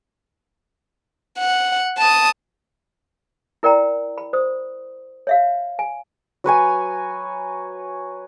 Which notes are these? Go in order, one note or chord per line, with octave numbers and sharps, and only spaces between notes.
F#5
A5 D#6
E4 A#4 D5 G5 A#5
B5
C5 D#6
C#5 E5 F5
G#5
F#3 B4 C#5 G#5